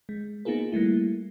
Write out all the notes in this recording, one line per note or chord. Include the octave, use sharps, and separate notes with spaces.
G#3
A#3 B3 D#4 F4 G#4 A#4
G3 A3 A#3 E4